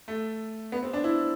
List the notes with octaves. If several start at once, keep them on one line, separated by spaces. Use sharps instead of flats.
A3
B3
C4
D4
E4